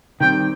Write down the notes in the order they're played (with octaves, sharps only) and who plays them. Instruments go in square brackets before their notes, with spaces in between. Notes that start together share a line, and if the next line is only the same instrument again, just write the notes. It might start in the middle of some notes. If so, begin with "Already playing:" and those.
[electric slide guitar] D#3 G3 C4 [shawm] G5